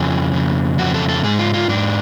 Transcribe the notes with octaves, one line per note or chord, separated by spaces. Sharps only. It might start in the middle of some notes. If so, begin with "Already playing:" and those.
Already playing: F2 C#3 G#4
F2 C#3
F2 C#3 F#4
A4
A4
G#2 G#4
F4
F4
G#2 D4